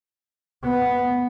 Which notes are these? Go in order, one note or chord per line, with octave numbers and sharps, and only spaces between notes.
B3